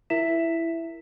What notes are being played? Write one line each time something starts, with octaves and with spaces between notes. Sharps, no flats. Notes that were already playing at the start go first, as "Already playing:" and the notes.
E4 A#4 E5 B6 E7